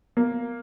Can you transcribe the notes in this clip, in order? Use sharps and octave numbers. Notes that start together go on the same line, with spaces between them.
A#3